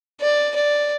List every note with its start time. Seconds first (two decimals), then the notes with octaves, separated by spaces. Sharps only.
0.21 D5
0.55 D5